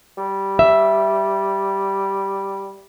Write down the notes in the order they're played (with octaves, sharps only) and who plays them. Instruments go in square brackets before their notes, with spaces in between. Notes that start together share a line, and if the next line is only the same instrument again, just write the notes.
[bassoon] G3
[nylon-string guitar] E5